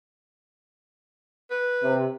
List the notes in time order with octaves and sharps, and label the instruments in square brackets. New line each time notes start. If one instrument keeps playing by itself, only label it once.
[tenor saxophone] B4
[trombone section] C3